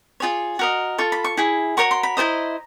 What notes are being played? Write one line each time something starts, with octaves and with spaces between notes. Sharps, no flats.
F4 G#4 C#5
F#4 A#4 D#5
F4 A4 C#6
B5
C#6
E4 G#4
F#4 A#4 C#5 C#6
C6
B5
E4 A4 C5 D#5 A#5